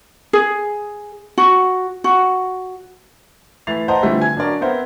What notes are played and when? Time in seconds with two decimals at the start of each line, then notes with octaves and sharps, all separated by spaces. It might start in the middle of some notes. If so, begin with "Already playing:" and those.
0.33 G#4
1.38 F#4
2.04 F#4
3.67 E3 A3 A6 C7 F7
3.88 C5 D#5 F#5 A5 A#5 C6
4.02 D3 E3 F3 G3 A3 C4
4.21 G#5 G#6
4.36 F#3 D4 F#4 A#4 D5
4.61 B3 C4 A#4 C5 E5 F#5